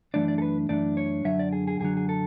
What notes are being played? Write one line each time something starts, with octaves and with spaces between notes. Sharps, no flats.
F#2 E3 A3 D4 D5
D5
A4
B4
F#2 E3 A3 D4 D5
C#5
F#2 D3 F#3 E5
D5
G#4
G#4
F#2 D3 F#3 G#4
G#4
A4